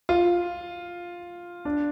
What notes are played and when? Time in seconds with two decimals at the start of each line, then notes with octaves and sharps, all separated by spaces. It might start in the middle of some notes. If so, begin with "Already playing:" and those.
0.09 F4
1.65 D4